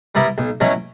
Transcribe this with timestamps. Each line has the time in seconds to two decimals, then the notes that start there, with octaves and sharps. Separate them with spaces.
0.15 G3 B3 E4 A#4
0.38 B1
0.60 B2 F#3 C#4 E4